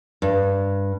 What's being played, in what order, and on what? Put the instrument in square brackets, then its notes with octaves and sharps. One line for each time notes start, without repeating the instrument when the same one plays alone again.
[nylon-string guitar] G2